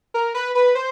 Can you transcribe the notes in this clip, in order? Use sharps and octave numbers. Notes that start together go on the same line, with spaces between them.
A#4
B4
B4
C5